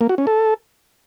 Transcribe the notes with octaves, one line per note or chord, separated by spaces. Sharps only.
A#3
F#4
C#4
A4